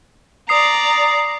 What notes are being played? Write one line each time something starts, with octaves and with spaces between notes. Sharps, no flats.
D5 A#5 D#6 C7